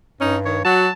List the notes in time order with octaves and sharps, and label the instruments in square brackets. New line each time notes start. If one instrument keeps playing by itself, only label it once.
[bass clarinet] G2 [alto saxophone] C#4 [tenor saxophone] D#4
[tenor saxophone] D#3 [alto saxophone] C#5
[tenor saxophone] F#3 [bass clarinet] F#4 [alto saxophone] A5